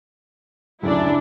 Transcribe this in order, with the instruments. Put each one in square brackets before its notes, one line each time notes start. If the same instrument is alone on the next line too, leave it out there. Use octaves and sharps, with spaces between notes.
[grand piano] D1 F#2 C#3 [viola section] D4 E4